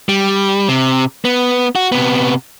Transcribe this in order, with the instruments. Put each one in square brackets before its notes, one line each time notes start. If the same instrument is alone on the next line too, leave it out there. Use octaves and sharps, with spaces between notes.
[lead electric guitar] G3
C3
B3
F#4
C3 B3